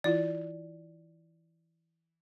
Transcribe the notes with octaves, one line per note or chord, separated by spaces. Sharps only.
E3 E4 F4 D5